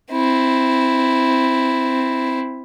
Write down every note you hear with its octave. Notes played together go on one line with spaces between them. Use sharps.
C4 E4